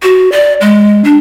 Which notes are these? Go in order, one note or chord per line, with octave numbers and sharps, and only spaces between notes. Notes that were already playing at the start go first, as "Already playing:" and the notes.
F#4
D5
G#3
D4